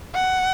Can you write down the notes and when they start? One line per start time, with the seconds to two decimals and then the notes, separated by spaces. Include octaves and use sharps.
0.15 F#5